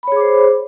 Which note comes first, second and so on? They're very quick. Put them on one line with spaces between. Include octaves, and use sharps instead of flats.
B5 C#5 G#4 D6 C5